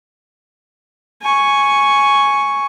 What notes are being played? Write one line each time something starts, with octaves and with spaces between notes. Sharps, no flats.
G#5 C#6